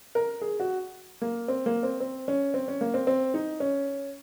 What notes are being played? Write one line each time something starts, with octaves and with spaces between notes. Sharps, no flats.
A#4
G#4
F#4
A#3
C4
A#3
C4
C4
C#4
C4
C#4
A#3
C4
C4
D#4
C#4